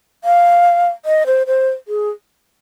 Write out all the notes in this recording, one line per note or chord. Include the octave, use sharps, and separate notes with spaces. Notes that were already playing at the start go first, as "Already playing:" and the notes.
F5
D#5
C5
C5
G#4